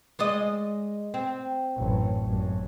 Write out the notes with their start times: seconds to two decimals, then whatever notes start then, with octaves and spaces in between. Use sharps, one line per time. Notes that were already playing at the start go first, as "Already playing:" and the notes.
0.19 G#3 D5 D#5
1.14 C4
1.76 A1 F#2
2.22 G#1 F#2